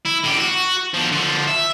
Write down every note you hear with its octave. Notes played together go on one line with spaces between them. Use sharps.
E4
A2 G4
F#4
B2 F3
D3 F3
E5